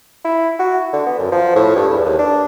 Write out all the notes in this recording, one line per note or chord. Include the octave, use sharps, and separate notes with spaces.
E4
F#4
D3
B3
F#2
F3
A2
G2
E2
D#2
D4